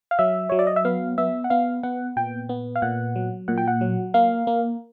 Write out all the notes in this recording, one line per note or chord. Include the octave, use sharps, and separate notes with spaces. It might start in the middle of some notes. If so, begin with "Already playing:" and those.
F5
F#3 E5
F#3 C#5
D5
D#5
E5
B3 F5
B3 E5
F#5
B3 F5
B3 F#5
A#2 G5
B3
F5
A#2 F#5
F#3
A#2 F#5
G5
F#5
F#3
A#3 F5
A#3